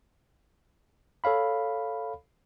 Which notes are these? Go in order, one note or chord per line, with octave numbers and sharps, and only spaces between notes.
A4 C#5 F5 B5